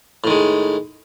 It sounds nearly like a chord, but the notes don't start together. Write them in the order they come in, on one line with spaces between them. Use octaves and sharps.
A2 D#3 G#3